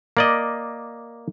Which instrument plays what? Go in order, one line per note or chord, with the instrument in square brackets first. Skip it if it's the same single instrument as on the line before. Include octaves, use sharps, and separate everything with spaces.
[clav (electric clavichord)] A#3 D5 D#5